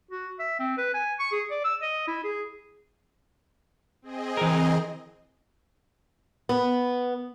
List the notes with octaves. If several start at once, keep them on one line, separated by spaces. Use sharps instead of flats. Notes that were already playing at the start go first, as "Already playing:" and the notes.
F#4
E5
C4
B4
G#5
C#6
G#4
D5
E6
D#5
E4
G#4
C4 G#4 D#5
E3 A#4
B3